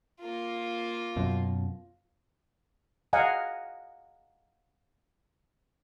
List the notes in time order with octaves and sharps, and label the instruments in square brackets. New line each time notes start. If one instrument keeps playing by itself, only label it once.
[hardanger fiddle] A#3 F4
[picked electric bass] F#2 B2
[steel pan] D#5 F5 F#5 G#5 A#5